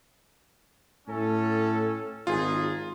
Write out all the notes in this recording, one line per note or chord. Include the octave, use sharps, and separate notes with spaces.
A2 C#4 A4
G#1 D#4 F4 G#4